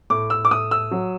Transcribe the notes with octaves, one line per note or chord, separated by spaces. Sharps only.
A2 D6
E6
D6
A2 D#6
E6
F#3